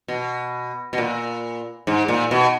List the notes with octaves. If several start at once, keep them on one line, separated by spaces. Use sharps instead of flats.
B2
B2
A#2
G#2
A#2
B2